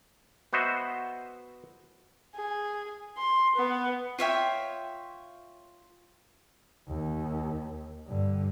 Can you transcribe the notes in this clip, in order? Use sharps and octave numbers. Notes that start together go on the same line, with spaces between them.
B3 F#4 C5 D#5 E5
G#4
C6
B3
F4 C#5 E5 G5
D#2
G2 D3